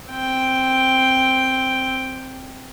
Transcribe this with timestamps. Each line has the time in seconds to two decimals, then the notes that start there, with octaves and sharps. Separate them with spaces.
0.11 C4 G5